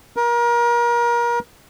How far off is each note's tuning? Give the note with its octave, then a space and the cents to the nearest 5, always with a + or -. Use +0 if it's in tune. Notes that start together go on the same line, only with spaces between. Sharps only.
A#4 +30